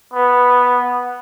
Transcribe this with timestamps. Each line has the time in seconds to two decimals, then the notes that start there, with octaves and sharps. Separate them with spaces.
0.13 B3